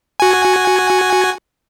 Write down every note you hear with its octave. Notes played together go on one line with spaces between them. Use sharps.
F#4 G#5